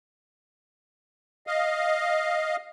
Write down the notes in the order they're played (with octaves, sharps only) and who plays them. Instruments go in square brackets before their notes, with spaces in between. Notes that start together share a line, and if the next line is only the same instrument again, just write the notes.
[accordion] D#5 F5